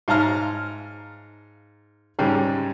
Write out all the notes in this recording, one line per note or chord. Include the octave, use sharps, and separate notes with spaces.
G#2 F5 A5 A#5 F6
G#2 C#3 G3